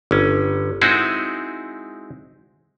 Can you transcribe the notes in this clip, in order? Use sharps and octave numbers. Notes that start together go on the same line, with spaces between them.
G1 C#4
G#3 C4 D#4 E4 F#4 G#4